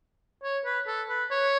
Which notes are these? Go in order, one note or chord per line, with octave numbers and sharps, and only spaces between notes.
C#5
B4
A4
B4
C#5